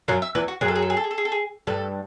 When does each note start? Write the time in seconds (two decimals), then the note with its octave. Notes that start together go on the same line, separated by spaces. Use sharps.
0.08 F#2 F#3 F5
0.22 E5
0.35 E2 E3 B4
0.48 F#4
0.61 F#2 F#3 G#4
0.68 A4
0.76 G#4
0.82 A4
0.90 G#4
0.97 A4
1.04 G#4
1.11 A4
1.18 G#4
1.25 A4
1.32 G#4
1.67 G2 G3 A4